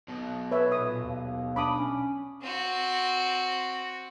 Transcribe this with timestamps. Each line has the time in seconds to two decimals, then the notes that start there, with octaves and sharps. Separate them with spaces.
0.08 B1 B2
0.51 B4 C#5 E5
0.72 A#2 D#6
1.04 D#2
1.56 D4 B5 D6 D#6
1.77 C#4
2.42 C4 F#4